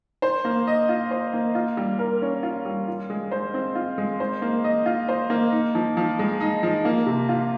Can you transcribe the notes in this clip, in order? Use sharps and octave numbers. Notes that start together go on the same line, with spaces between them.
C5
A#3
D#5
F4
C5
A#3
F4
G3
A#4
C#4
F4
G3
F4
G#3
C5
C4
F4
G#3
C5
A#3
D#5
F4
C5
A#3
D#4
F3
F3
G#3
D#4
F3
A#3
C3
F4